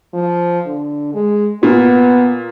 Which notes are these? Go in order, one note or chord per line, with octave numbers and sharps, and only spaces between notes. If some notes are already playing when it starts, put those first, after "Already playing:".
F3
D3
G#3
A#2 B3